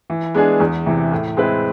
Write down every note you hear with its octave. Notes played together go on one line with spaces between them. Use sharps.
E3
G#3 B3 D4 G#4
E2
C3 E3
A2
G#3 C4 E4 B4